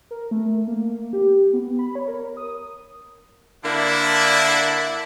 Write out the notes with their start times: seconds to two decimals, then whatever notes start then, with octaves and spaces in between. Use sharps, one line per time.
0.11 A#4
0.31 A3
0.67 A#3
1.13 G4
1.53 B3
1.79 B5
1.95 C#5
2.08 A#4
2.37 D#6
3.64 D3 A#3 D4 E4